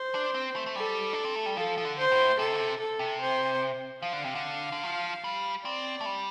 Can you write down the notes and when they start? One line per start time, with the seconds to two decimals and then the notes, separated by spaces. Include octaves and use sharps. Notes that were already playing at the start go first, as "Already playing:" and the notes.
Already playing: C5
0.15 D4
0.34 C4
0.56 A3
0.66 A3
0.76 G3 A4
1.13 D4
1.25 C4
1.35 A3
1.46 G3
1.57 F3 A4
1.78 F3
1.85 D3
1.99 C5
2.12 A2
2.39 C3 A4
2.53 D3
2.59 C3
2.80 A4
2.99 C3
3.21 C5
4.02 F3 F5
4.13 D3
4.24 C3
4.35 D3
4.72 D3
4.84 F3
5.24 G3
5.64 C4 D5
6.01 A3
6.06 G3